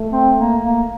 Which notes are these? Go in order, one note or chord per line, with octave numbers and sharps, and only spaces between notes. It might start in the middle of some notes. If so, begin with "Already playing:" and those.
Already playing: A3
C4
A#3
A#3